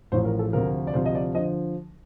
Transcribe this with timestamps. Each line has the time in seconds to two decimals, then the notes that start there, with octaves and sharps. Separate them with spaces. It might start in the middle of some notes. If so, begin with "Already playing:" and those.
0.12 A1 A2 F3 C5
0.25 A#4
0.39 A4
0.53 D2 C3 F3 A#4
0.87 D5
0.94 D2 C3 F3 C5
1.05 D#5
1.15 D5
1.35 D3 F3 D#5